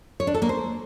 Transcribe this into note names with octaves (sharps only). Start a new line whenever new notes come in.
C#5
D4
A4
A#3
C5